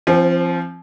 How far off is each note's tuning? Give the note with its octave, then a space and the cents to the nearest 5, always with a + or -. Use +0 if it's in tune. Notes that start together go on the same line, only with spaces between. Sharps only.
F3 -25 C4 +15